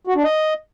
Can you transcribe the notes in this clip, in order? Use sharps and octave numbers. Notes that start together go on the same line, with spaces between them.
F#4
D4
D#5